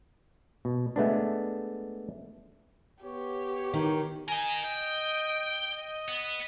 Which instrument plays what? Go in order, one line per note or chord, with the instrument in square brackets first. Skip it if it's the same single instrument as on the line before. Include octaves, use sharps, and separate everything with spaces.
[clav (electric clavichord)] B2
G#3 A3 B3 D4
[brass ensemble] B3 C#5 [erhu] G4
[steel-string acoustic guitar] D#3
[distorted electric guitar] A#4 D#5 [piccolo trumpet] G#5
[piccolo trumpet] D#5 [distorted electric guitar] G5
[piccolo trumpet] D#5
[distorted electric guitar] B3